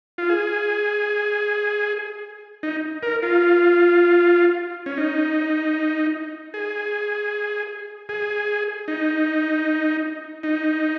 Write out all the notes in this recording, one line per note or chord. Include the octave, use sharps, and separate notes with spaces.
F4
G#4
D#4
A#4
F4
C#4
D#4
G#4
G#4
D#4
D#4